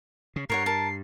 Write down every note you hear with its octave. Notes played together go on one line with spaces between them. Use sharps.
C#3
G2 A#4 C#5 F#5 C7
A#4 A5